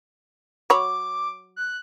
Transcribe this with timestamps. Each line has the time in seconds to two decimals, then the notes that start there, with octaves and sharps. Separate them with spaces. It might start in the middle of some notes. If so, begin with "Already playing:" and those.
0.70 F#3 C#5 B5 D6
1.56 F#6